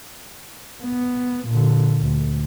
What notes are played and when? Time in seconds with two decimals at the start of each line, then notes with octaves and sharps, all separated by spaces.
0.83 B3
1.48 A#2 D3
2.01 D2